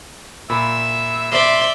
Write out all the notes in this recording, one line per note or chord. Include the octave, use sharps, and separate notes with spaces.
A#2 E5 B5
D5 E5 C6